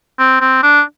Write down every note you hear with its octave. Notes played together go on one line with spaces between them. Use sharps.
C4
C4
D4